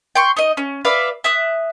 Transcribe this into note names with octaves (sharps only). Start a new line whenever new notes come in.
G5 C6 C#6
D#4 D#5
C#4
B4 D5 E5 F5
E5 D#6 F#6